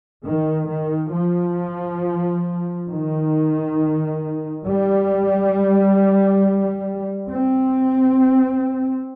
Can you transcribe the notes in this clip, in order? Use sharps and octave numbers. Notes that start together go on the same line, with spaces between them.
D#3
D#3
F3
D#3
G3
C4